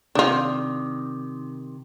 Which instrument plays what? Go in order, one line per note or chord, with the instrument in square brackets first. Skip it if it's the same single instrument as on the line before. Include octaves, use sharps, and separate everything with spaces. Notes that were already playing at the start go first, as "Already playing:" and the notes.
[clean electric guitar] C3 D#3 [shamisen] D4 F4